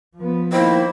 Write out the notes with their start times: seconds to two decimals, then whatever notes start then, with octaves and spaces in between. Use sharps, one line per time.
0.17 F3 B3
0.52 D#3 A#3 E4 C5